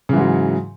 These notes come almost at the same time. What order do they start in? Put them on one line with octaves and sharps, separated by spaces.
C#3 E3 G#2 F#3